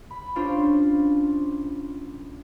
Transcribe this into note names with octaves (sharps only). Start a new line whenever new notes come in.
B5
C#4 D4 F4 C5